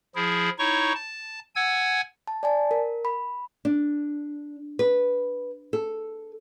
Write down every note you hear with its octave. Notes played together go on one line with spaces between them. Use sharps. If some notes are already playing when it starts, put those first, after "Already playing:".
F3 E4 G#4
D#4 E4 C#5 C#6
A5
F#5 G#5 E6 G#6
A5
D5 G#5 A5
A#4
B5
D4
B4
A4